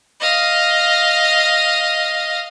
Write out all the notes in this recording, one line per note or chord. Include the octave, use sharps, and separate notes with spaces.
D#5 F5